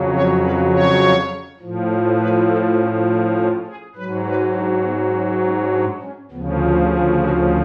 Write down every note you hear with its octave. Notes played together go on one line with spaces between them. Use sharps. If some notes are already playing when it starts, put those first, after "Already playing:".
Already playing: F2 C#3 F#3
C#5
B4
C#5
A2 F3
B4
A4
C#4
D4
C#4
G#4
G#2 F#3 B4
B4
D4
B3
C#4
C#4
D4
C#4
D2 C#3 F3 B3
C#4
G#4
F#4